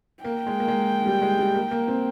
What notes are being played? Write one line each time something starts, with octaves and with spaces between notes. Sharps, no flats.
A#3 G5
G#3
A#3
G#3
G3
G#3
G3
A#3
A#3
C4